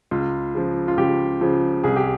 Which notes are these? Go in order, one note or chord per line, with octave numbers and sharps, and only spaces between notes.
C#2 F4
C#3 F3
F4
C#2 G4
C#3 F3
C2 G#4
G4